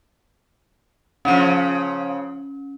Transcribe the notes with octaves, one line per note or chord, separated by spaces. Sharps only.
C#3 F3 C#4